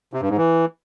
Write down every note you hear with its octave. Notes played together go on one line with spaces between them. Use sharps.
C3
G2
G#2
E3